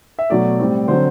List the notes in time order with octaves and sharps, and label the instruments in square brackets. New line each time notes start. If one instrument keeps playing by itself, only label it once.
[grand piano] E5
B2 F#3 A3 D5
A2 G3 C4
D3 F#3 C4 C5